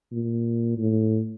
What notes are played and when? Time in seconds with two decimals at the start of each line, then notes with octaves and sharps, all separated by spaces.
0.12 A#2
0.78 A2